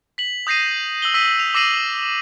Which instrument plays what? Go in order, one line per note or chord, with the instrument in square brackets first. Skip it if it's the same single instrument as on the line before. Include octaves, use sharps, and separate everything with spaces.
[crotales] B6 F#7
D#6 G6 A#6 C7 D#7
E6 F#7 G7
E6 B6 D#7
F7
D6 E6 A#6 C7 D#7 F#7